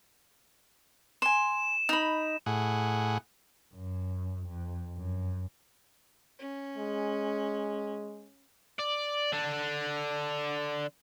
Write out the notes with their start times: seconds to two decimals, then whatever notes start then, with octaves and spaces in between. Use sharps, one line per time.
1.22 G#5 C6 E7
1.89 D#4 B5
2.46 A2 G#4 F#5
3.74 F#2
4.47 F2
4.97 F#2
6.39 C#4
6.78 G#3
8.80 D5
9.33 D3 D4